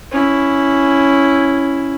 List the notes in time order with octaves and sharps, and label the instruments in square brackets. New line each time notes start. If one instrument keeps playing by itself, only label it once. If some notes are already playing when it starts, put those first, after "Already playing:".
[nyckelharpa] C#4 E4